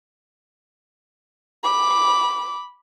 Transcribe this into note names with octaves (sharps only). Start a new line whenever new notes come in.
B5 D6